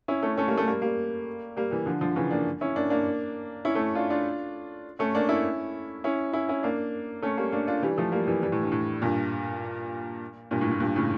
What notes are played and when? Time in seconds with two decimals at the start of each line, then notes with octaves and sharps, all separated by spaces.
0.08 C#4 E4
0.23 A3 C#4
0.37 A3 C#4
0.47 G3 A#3
0.57 A3 C#4
0.67 G3 A#3
0.82 G3 A#3
1.57 G3 A#3
1.71 E3 G3
1.86 D3 F3
2.01 D3 F3
2.16 C#3 E3
2.31 A#3 D4
2.61 C#4 E4
2.76 A#3 D4
2.90 A#3 D4
3.65 C#4 E4
3.75 A3 C#4
3.95 D4 F4
4.10 D4 F4
4.99 A3 C#4
5.15 A#3 D4
5.29 C#4 E4
6.04 C#4 E4
6.33 C#4 E4
6.49 C#4 E4
6.63 A#3 D4
7.22 A3 C#4
7.37 G3 A#3
7.52 A#3 D4
7.67 D4 F4
7.82 E3 G3
7.98 F3 A3
8.12 G3 A#3
8.27 E3 G3
8.42 E3 G3
8.52 A2
8.63 G2
8.72 A2
9.02 G2 A#2
10.51 G2 A#2
10.61 A2
10.71 A2
10.80 G2 A#2
10.96 A2 C#3